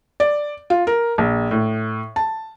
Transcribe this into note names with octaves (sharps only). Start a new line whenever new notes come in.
D5
F4
A#4
A#1
A2
A5